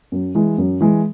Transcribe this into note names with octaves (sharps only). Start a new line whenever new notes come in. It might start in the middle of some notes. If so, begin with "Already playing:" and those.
F#2
E3 G#3
F#2
E3 G#3